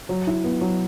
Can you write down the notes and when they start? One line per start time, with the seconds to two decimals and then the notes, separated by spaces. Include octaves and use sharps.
0.09 F#3
0.27 E4
0.44 B3
0.61 F#3